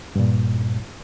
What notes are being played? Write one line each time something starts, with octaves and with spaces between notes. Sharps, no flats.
G2 A#2